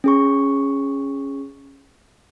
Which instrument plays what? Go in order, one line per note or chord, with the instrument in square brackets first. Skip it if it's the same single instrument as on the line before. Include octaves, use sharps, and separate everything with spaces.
[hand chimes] C#4 G#4 C#6